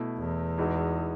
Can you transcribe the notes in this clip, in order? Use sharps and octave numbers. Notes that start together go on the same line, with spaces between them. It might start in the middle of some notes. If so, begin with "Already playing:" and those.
Already playing: B2 A3 E4
E2
E3 G#3 D#4 F#4